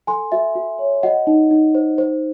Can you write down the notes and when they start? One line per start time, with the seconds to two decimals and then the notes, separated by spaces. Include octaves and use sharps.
0.07 A4 G#5 C6
0.32 F#4 E5
0.55 F#4
0.79 C#5
1.03 F#4 D#5 F#5
1.27 D#4
1.51 D#4
1.75 C5
1.98 C5